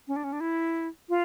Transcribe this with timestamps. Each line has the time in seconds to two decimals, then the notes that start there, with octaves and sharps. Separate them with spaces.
0.08 C#4
0.16 D4
0.24 C#4
0.33 D4
0.40 E4
1.09 F4